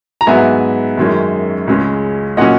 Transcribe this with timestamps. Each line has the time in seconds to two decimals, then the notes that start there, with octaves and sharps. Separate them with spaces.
0.21 A#5
0.27 G#2 F#3 B3 E5 G#5
0.97 F#2 D#3 G#3 C#4
1.67 C#2 C#3 G#3 C#4
2.37 A#2 F#3 C#4 D#5 F#5